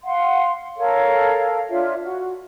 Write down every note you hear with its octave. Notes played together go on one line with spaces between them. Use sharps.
F5 F#5 C6
A4 A#4 C#5 F5
D4 F4 C#5 E5
F#4